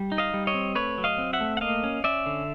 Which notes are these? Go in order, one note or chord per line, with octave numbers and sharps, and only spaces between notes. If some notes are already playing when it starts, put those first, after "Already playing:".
Already playing: G3
D#4
D#5 F5
G3
C#5 D#5
C4
A3 B4 C#5
F#3
D#5 F5
C4
E5 F#5
A3
F#5
A#3 D#5 F5
C#4
C#4 D5 E5
D3